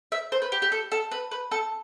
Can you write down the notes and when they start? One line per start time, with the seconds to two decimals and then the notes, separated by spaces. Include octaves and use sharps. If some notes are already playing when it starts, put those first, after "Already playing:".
0.12 E5
0.32 C5
0.42 B4
0.52 G4
0.62 G4
0.72 A4
0.92 A4
1.11 B4
1.31 B4
1.51 A4